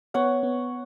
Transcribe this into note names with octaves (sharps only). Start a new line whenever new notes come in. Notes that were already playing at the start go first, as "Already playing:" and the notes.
B3 C#5 F#5
B3